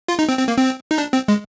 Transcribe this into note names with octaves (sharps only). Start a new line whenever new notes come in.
F4
D#4
C4
C4
A#3
C4
D#4
D4
C4
G#3